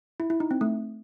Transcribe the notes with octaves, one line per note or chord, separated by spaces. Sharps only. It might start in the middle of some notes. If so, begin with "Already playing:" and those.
E4
E4
D#4
C4
A3